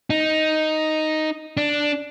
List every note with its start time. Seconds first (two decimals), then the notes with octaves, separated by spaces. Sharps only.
0.10 D#4
1.57 D4